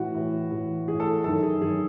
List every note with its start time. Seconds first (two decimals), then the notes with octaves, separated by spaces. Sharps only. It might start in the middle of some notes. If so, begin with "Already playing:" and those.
Already playing: A2 E3 F#4
0.14 A2 E3
0.51 A2 E3
0.87 A2 E3 G#4
1.00 A4
1.24 F#2 D#3 A4
1.43 G#4
1.61 F#2 D#3 G#4